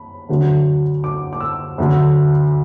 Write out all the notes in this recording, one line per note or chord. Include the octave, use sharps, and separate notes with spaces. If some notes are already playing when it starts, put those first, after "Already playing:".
Already playing: B5
D2 D3 F#3
D6
D6
E6
D2 D3 F#3